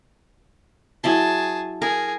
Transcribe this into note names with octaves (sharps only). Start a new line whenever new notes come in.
F#3 E4 G#4 A5 C6
G#4 A#4